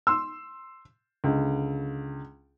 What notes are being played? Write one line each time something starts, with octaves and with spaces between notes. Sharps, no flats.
C6 E6
C#2 D3